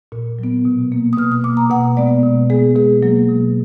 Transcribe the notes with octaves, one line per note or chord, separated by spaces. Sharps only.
A#2
F#3 B3
B2
A#3
D#6
B2 F6
D#6
A#3 D6
A#5
B2 F#5
G#3 B3 D5
B2
G#3 B3 G#4
B2 G#4
F#3 A#3
B2